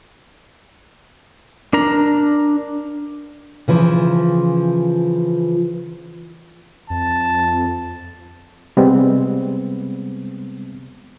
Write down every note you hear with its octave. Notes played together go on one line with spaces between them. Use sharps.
D4 A#4 A#5
C#3 E3 F3
F2 A5
C3 G3 G#3 B3 C4